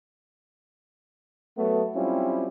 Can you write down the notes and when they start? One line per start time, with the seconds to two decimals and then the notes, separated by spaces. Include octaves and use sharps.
1.58 F#3 A3 B3
1.95 F#3 G3 C4 C#4 E4 F4